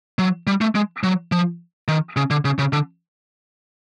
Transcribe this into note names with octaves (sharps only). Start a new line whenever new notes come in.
F#3
G3
A3
G#3
F#3
F3
D#3
C#3
D3
C#3
C#3
D3